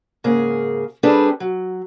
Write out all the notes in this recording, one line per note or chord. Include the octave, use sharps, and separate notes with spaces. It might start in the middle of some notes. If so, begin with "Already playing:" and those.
G#2 C#3 A#3 G#4
G3 C4 D4 G#4 A4 B4
F#3